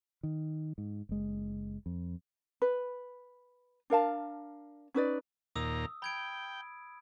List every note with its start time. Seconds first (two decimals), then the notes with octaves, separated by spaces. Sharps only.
0.23 D#3
0.78 G#2
1.09 F#1 G#3
1.86 F2
2.62 B4
3.90 D4 A#4 F5 A5
4.95 C#4 D#4 B4 D5
5.56 D#2 A#2 A#5 D#6 E6
6.02 G5 B5 G#6 D7